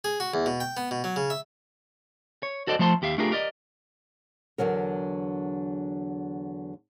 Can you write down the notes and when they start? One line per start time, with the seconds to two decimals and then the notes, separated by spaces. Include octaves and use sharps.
0.04 G#4
0.20 F#4
0.34 E2
0.46 B2
0.60 G5
0.77 B3
0.91 B2
1.04 F#3
1.16 C#3
1.30 E5
2.43 C#5
2.67 F#4 A4 C5 D5 D#5
2.79 F3 A3 C5 A5 A#5 C6
3.02 D#2 G4 E5 F5
3.18 A3 D4 F4 G4 G#4 A#4
3.32 G4 A#4 D5 D#5
4.58 E2 D3 F3 F#3 A#4